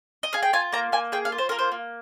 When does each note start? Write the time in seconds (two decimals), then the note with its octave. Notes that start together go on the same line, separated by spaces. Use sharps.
0.23 D#5
0.33 G#4 F5
0.43 G5
0.53 F4 G#5
0.72 A#3 A#5
0.92 A#3 G#5
1.12 G#4 G5
1.25 F5
1.32 F4
1.38 C5
1.49 A#3 A#4
1.59 C5
1.72 A#3